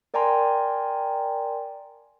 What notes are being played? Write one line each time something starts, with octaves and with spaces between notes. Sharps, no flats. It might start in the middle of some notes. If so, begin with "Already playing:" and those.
A#4 D5 G5 G#5 A#5 C6